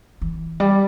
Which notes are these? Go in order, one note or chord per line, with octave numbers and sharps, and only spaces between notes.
E3
G3